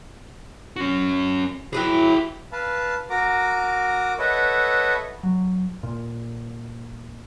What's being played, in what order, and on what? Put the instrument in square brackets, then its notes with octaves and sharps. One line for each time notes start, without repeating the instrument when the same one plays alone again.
[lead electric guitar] C#4 F#4
[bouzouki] E3 F#3 E4 [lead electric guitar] G#4 G5
[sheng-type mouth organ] B4 F5 A5
F#4 A#4 A#5 D6
A4 B4 C#5 D#5 E5 F#5
[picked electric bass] F#3
A#2